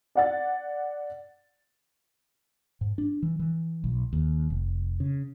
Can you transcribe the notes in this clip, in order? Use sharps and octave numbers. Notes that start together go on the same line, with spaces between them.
D5 F#5 A6
G#2
D4
E3
E3
B1
D#2
F1
C#3